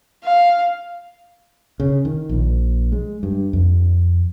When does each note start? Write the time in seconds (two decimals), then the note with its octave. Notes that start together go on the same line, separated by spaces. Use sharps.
0.24 F5
1.80 C#3
2.05 D#3
2.29 A#1
2.92 G#3
3.23 G2
3.53 F2